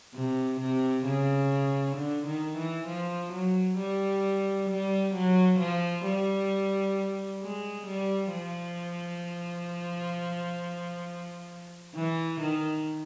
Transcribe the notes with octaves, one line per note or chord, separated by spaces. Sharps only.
C3
C3
C#3
D3
D#3
E3
F3
F#3
G3
G3
F#3
F3
G3
G#3
G3
F3
E3
D#3